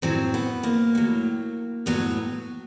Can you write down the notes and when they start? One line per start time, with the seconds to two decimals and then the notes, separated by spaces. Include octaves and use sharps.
0.02 A2 F#3 C4
0.34 B3
0.63 A#3
0.95 A2 F#3
1.86 A2 F#3 B3